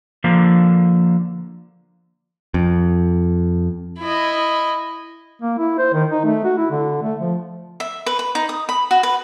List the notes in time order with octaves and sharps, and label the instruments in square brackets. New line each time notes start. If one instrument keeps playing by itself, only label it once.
[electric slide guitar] D3 F3 A#3
[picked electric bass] F2
[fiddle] E4 D#5
[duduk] A#3
E4
C5
D#3
D#4
A3
F#4
E4
D3
A3
F3
[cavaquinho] E5
B4
B4
D#4
D#6
B5
F#4
B4